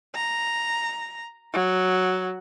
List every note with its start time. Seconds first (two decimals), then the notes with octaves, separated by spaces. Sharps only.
0.15 A#5
1.53 F#3